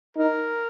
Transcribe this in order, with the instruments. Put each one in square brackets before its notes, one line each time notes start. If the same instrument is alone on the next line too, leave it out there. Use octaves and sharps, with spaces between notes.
[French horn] D#4 [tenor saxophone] A#4